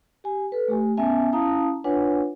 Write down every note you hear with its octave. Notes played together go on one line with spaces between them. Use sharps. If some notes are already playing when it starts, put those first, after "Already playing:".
G4 G#5
A4 B4
A3 G4 G#5
B3 C#4 E5 G#5 A5
C#4 E4 F5 A5 A#5 D#6
D4 F4 B4 C#5 F#5 G#5